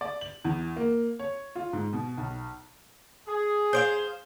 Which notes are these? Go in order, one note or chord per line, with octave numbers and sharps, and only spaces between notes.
D5
F#7
E2
A#3
C#5
F4
G#2
B2
B1
G#4
C5 D5 F5